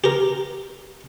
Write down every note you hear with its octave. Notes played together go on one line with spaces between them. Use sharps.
G4 A#4